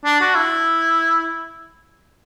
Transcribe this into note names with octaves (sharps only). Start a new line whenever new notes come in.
D4
F#4
E4